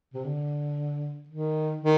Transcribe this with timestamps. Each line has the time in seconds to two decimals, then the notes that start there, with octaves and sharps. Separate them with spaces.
0.14 C3
0.24 D3
1.29 D#3
1.81 D#3